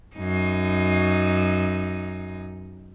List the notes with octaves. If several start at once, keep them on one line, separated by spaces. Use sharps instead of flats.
F#2 D#4